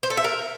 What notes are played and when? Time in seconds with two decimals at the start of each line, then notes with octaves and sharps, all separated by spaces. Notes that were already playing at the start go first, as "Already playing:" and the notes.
0.03 C5
0.10 A4
0.17 E5
0.24 A#4